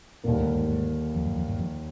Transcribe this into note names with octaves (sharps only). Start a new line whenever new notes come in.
D#2 A#2 D3 G3 A#3
A2
G#2
G#2
F2
F#2
F2
G2
F2